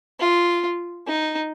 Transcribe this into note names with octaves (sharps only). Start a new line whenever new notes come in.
F4
D#4